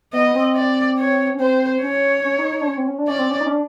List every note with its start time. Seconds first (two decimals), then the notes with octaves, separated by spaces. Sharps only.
0.13 B3 D#5
0.35 C4
0.55 D5
0.98 C#5
1.34 C#4
1.39 C4 C5
1.82 C#4 C#5
2.24 C#4
2.38 D#4
2.52 D#4
2.61 D4
2.67 C#4
2.77 C4
2.88 C#4
2.98 D4
3.08 C#4 D5
3.19 C4
3.30 C#4
3.41 D#4
3.46 C#4
3.51 D4